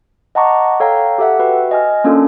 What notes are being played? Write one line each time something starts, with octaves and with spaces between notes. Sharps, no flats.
D#5 F#5 A5 A#5 C#6 D6
A4 C#5 F5 G5 A#5
G4 A4 E5 F#5
F#4 B4 E5 G5
D#5 G#5 F6
A#3 C#4 D4 F4 A4